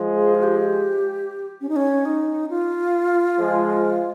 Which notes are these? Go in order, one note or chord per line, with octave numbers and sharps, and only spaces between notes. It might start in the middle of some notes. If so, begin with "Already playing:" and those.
Already playing: F3 G#3
G#4
F4
G4
C#4
D#4
C#4
D#4
F4
F3 G#3